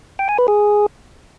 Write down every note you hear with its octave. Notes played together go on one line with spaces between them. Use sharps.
G5
G#5
B4
G#4